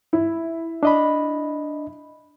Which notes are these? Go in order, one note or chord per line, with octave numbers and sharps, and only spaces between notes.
E4
D4 D#5 B5